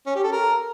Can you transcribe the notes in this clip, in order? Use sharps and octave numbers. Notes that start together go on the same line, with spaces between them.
C#4
G4
A4
A#4